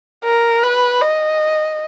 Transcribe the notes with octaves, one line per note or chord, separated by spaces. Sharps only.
A#4
B4
D#5